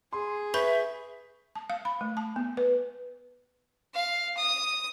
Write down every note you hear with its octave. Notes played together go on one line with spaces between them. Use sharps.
G#4 C6
B4 E5 B5 C#6 G6
A5
F5
B5
A3
A5
B3
B4
F5
D#6